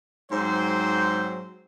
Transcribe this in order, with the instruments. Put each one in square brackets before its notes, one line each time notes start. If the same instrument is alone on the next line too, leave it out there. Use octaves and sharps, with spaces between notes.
[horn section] G#2 F#3 C4 C5